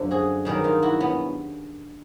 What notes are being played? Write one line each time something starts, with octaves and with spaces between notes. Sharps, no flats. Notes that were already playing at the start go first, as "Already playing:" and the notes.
Already playing: F#2 D3 F3 D4
F#4 G#4
G2 D#3 F#3 G#4 A#4
D#4 F4
E4 F#4
B3 C#4